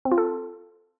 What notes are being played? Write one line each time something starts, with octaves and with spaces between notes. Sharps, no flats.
C4
F4
A4